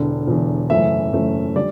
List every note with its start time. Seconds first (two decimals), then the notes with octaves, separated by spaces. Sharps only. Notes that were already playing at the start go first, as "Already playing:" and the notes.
Already playing: E1 E2 D3
0.27 E1 E2 D3
0.70 F#1 F#2 E3 A3 E5
1.13 F#1 F#2 E3 A3
1.56 D3 G3 D5